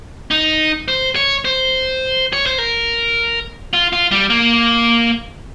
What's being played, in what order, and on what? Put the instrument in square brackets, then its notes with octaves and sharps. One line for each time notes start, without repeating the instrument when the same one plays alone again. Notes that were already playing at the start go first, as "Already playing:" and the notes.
[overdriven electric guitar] D#4
C5
C#5
C5
C#5
C5
A#4
F4
F4
G3
A#3